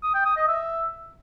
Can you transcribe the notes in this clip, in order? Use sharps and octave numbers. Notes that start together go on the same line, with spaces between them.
D#6
G5
D#6
D#5
E5